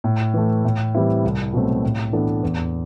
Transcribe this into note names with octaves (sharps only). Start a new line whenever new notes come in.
A2
E3 A3
A2
E3 G3 C4 E4
C2
B2 F#3 A3 C4
A2
E3 B3 D4 A4
E2